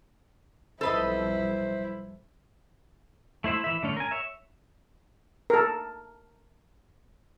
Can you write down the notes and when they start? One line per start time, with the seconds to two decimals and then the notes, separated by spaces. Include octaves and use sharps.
0.81 B1 F2 G3 E4 A4 B4 C5 D#5
3.44 A3 E4 C5 E5
3.64 E3 E5
3.83 D3 A3 C#4
3.97 A#4 G#5
4.11 C#5 E5
5.50 A4 A#4